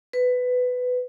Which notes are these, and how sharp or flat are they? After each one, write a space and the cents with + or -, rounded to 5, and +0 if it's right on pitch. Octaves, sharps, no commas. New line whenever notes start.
B4 +15